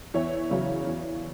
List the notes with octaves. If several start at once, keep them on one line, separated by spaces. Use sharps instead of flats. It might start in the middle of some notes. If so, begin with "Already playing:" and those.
E2 C#5 E5
C#3 F#3
E2